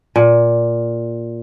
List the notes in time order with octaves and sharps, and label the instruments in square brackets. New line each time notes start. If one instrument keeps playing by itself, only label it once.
[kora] A#2